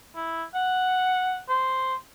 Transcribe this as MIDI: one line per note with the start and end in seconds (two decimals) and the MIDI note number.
0.16 0.43 64
0.55 1.39 78
1.49 1.95 72